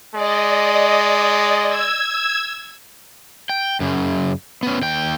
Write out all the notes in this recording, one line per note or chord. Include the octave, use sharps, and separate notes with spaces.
G#3 D5 D#5
E6 G#6
G5
F#2 C#3
B3 C#4
D#2 G5